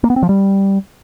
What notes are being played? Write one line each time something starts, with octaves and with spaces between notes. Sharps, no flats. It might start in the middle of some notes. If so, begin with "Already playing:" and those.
A#3
B3
C4
F3
G3